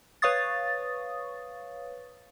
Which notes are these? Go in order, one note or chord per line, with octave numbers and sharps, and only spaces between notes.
B4 C#5 F5 C#6 D#6 A6